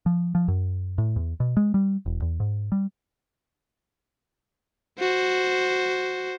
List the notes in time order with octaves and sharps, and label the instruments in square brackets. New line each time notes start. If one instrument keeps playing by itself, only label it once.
[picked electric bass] F3
F3
F#2
A2
E2
B2
G#3
G3
E1
E2
G#2
G3
[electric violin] F#4 C5